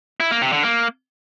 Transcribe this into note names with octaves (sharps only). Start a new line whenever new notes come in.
E4
A#3
C3
D3
A#3